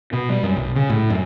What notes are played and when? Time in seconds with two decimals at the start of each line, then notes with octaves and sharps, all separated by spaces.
0.13 B2
0.29 G3
0.43 F#2
0.57 B1
0.76 C#3
0.90 A2
1.10 F#2